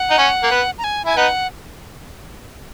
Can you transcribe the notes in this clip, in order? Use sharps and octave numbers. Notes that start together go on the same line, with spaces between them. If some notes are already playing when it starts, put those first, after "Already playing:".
Already playing: F#5
D#4
C#4
A#3
B3
A#5
G#5
E4 G#5
B3 D#4 F#5